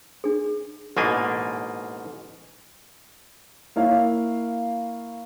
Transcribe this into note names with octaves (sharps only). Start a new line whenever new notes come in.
D4 G#4
A1 G#2 B2 A#3 D4 G#5
A#3 E4 C#5 F5